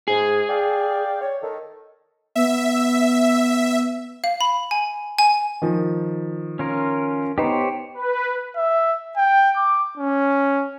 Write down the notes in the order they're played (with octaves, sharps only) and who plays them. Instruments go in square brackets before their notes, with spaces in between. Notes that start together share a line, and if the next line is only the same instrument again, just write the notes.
[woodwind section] G#2 [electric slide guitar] G#4
[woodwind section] D5 F5 G5
C#5
D#3 A4
[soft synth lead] B3 [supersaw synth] E5
[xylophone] F5
B5
G#5
G#5
[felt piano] D#3 F3
[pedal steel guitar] C#4 F4 A#4
[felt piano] B3 D#4 [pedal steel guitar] G4 C5 C#5
[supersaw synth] B4
[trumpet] E5
G5
D6
C#4